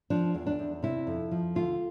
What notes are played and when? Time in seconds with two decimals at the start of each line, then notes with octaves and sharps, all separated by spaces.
0.10 F3 D4
0.34 E2
0.47 D4
0.59 E2
0.83 C3 E4
1.07 F2
1.31 F3
1.55 D2 F4